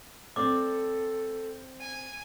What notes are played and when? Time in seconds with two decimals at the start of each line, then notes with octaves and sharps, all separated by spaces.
0.36 C4 A4 D5 D6
1.81 G#5